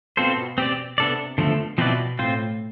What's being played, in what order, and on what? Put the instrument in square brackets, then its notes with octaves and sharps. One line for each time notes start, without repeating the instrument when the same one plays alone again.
[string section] B2 [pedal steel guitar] C4 F4 A4 C5
[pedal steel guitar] C4 G4 D5
[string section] C3 [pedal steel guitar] B3 D4 A4 D5
[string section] B2 [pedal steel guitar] D3 F3 A3
[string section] B2 [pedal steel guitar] F3 C4 E4 B4 D5
[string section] A2 [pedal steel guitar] C4 F4 C5